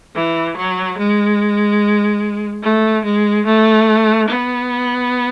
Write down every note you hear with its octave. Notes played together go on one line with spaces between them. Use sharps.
E3
F#3
G#3
A3
G#3
A3
B3